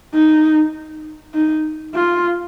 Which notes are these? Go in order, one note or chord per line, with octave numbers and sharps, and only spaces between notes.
D#4
D#4
F4